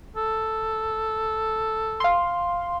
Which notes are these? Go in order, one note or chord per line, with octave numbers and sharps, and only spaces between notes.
A4
F5 C6